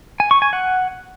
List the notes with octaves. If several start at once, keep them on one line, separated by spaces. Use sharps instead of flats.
G#5
C#6
G#5
F#5